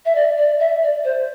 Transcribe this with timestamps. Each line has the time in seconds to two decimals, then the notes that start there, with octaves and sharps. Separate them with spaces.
0.06 E5
0.15 D5
0.38 D5
0.60 E5
0.83 D5
1.05 C5